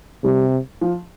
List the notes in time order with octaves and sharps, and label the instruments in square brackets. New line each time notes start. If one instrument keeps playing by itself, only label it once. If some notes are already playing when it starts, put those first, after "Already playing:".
[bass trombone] C3 [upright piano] G3
[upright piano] F3